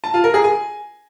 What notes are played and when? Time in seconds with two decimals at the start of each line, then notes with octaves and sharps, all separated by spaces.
0.04 A5
0.14 F4
0.24 A#4
0.34 G#4
0.44 G#5